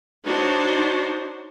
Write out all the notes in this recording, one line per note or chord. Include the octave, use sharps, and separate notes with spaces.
D4 D#4 F#4 C5 C#5